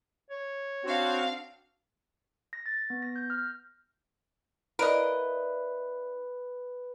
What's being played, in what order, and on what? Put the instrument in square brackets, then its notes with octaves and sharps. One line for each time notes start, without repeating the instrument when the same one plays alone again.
[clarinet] C#5
[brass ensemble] C4 F#4 [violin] D4 F5
[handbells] A#6
A6
B3
A#6
G6
F6
[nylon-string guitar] E4 D5 F5 [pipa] A#4 D#5 [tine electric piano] B4